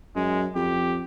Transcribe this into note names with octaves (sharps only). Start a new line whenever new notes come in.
F#2 G#3
F2 G4